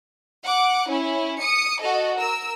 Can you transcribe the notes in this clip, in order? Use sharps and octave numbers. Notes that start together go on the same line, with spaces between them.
F#5 D6
C#4 E4
D#6 C#7
F#4 A4 D#5
A#4 E6